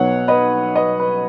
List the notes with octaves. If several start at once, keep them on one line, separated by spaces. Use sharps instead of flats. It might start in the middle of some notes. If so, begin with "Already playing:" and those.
Already playing: B1 B2 F#3 B3 C#5 F#5
B4 D#5
B4 D#5
B4